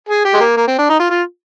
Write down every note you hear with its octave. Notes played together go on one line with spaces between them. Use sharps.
G#4
G4
G#3
A#3
A#3
C4
D4
D#4
F4
F4